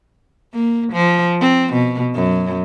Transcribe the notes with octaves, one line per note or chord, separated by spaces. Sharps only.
A#3
F3
C4
B2
F#2